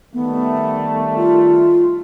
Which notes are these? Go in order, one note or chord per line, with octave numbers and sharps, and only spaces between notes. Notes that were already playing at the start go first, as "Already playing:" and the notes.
D#3 G3 A3 B3
F4